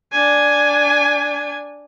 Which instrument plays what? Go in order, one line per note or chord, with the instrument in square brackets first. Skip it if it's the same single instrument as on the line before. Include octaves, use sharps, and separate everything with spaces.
[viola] D4 G#5